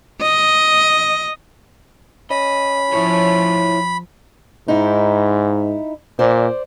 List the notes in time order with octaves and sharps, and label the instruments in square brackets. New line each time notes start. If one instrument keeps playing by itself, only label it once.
[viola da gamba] D#5
[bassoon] C#4 [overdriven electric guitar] D#5 [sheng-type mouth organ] B5
[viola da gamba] F3 [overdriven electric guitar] E4 C#5
[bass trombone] G#2 [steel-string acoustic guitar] D#4 E4
[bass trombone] A#2 [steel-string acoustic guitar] C5 D5